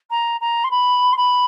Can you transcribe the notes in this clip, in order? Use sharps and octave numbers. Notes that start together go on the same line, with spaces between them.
A#5
A#5
C6
B5
C6
B5